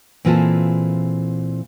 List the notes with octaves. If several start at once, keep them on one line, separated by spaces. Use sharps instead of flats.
A#2 E3 C4 F4 G#4 A4